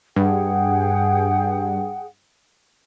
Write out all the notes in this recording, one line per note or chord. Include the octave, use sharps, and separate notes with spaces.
G2 G#4 F#5 G5